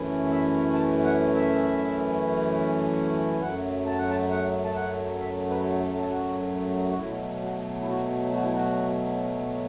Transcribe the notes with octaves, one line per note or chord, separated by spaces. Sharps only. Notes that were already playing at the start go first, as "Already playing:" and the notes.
Already playing: F#2 E3 A3 C#4 E4
E5
A5
F#5
E5
F#2 F#3 A3 F#5
A5
F#5
A5
F#5
A5
F#5
E5
B4
A4
A4
F#4
F#4
B2 F#3 A3 E4
F#4
E4
F#4
F#4
E4
F#4